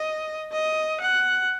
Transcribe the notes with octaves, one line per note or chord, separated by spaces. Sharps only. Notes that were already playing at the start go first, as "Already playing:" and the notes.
Already playing: D#5
D#5
F#5